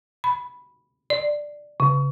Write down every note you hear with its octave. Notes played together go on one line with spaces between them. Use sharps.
B5
D5
C#3